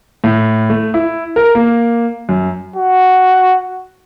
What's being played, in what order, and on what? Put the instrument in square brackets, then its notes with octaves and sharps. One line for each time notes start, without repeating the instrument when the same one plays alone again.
[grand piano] A2
A3
E4
A#4
A#3
F#2
[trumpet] F#4